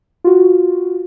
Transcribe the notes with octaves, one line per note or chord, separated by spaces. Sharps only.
F4 F#4